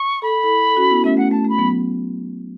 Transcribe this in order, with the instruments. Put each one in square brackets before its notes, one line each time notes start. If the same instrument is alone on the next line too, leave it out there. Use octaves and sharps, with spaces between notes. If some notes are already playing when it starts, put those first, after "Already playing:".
Already playing: [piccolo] C#6
[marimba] A4 [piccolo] B5
[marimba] E4 A4
A4
C#4 F#4
B3 E4
[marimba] A3 C#4 [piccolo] E5
[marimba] A3 [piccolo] F#5
[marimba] A3 [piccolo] A5
[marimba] A3 [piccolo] B5
[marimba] F#3 B3